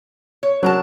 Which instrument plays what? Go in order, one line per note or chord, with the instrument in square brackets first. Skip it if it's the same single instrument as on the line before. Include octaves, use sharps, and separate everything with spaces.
[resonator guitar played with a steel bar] C#5
[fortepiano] F#3 [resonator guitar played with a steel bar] D4 A#4 A5